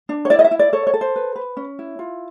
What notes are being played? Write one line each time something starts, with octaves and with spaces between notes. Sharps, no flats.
D4
C#5
E4 D5
D#5
E5
E4
D5
A4 C#5
C#5
A4
C5
B4
B4
C#4
E4
F4